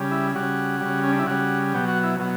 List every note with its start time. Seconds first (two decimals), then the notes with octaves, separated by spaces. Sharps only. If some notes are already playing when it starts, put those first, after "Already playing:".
Already playing: C#3 G3
0.11 E4
0.35 C#3 G3 F#4
0.80 G3
0.86 C#3
1.04 C#4
1.12 D4
1.19 E4
1.27 C#3 G3 F#4
1.74 B2 F#3 G4
1.88 F#4
2.04 E4
2.20 B2 F#3